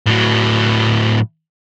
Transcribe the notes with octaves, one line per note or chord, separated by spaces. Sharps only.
A2 F#3